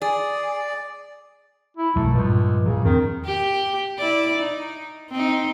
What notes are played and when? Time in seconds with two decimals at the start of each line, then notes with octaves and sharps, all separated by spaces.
0.02 G#4 D5
1.77 E4
1.96 B1 F#2 E3 F#3 G3 A3
2.14 C#2 G2 A#2 F3 G3
2.66 G#2 C#3 F3 F#3
2.85 E2 D#3 C4 D4
3.26 G4
3.98 E4 D5
4.37 D#4
5.11 C4 D#4